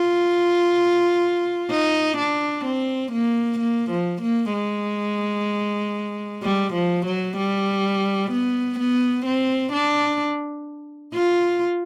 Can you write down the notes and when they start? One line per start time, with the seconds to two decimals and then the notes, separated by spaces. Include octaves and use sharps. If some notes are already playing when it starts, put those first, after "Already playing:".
Already playing: F4
1.70 D#4
2.18 D4
2.65 C4
3.12 A#3
3.59 A#3
3.91 F3
4.22 A#3
4.53 G#3
6.43 G3
6.73 F3
7.06 F#3
7.37 G3
8.31 B3
8.79 B3
9.26 C4
9.73 D4
11.14 F4